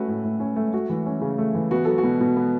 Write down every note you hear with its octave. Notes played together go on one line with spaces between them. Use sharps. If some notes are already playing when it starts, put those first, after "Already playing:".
Already playing: A3 C#4 F#4 B4
A2
A2
C#4
A3
A3 F#4
E3
C#4
C#3
A3
E3
B3 F#4
F#3 A4
F#4
B2
B2
B3